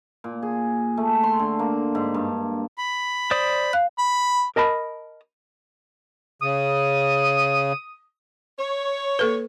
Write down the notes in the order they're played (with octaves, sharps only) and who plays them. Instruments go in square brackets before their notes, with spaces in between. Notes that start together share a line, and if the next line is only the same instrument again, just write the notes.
[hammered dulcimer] A#2
G#4
A3
C6
D3
A#3
G#2
G2
[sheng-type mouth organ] B5
[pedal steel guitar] C5 D5 D#6
[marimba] F5 F#6
[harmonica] B5
[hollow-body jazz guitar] A#4 D#5 A5 B5
[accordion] C#3 [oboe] D#6
[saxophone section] C#5
[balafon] A#3 A4 B4